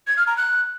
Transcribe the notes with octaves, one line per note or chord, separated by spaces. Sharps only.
G#6
F6
A#5
F#6